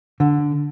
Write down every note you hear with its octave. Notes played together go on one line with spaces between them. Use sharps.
D3